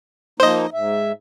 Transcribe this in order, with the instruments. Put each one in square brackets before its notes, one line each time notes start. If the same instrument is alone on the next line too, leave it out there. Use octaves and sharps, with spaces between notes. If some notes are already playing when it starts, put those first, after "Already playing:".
[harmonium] F3 A#3 D#4 [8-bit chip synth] C5 D#5
[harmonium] G#2 E5